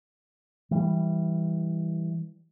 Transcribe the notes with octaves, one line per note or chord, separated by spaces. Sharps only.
E3 G3